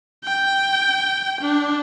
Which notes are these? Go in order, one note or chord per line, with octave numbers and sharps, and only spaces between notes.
G5
D4